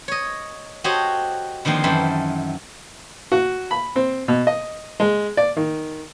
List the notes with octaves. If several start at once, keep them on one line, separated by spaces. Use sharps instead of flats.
C#5 D#5
F#4 G4 A4 C5 C#5 D#5
D3 D#3 F3 A#3 C4
F#2 D#3 E3 A4 C5 B5
F#4
B5
C4
B2
D#5
G#3
D5
D#3